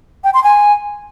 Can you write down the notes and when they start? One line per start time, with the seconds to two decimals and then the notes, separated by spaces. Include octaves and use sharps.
0.24 G5
0.34 C6
0.44 G#5